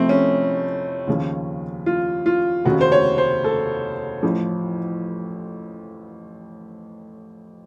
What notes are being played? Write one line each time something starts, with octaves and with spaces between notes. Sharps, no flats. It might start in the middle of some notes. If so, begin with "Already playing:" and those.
Already playing: F1 F2 F3 A3 C4
C#4
D#2 C#3 F3
F4
F4
F1 D#2 C#3 F#4
C5
C#5
C5
A4
A1 A2 F3